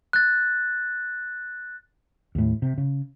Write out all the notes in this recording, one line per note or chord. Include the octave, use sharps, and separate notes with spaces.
F#6 A6
D#2 A2
C3
C#3